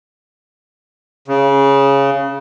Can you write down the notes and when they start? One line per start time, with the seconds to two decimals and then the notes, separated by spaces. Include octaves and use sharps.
1.28 C#3